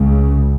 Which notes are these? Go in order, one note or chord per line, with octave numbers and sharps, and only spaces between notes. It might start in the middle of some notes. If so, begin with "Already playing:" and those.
Already playing: C#2 C#3